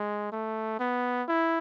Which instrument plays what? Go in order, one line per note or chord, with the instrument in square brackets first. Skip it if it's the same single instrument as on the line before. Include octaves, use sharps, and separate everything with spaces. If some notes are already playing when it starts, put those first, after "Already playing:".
Already playing: [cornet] G#3
A3
B3
E4